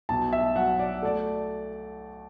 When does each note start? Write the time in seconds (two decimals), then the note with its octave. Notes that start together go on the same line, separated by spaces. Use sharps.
0.09 B1 A5
0.33 E5
0.56 F#3 F#5
0.79 D5
1.02 A3 D5